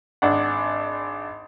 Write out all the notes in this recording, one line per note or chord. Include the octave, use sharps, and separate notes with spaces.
G#1 D4 F#5